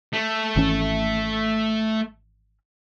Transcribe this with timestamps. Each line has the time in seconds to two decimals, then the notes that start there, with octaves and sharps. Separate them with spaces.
0.14 A3
0.56 G#1 E3 C#4